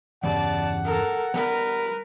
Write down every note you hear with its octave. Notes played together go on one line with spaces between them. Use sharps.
E2 G2 C#3 D5 F#5 A5
A4 A#4
G3 B3 A#4 B4